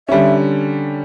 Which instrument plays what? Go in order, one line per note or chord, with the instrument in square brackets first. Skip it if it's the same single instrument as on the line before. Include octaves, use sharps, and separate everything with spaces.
[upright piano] D3 G3 C#4 [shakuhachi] E5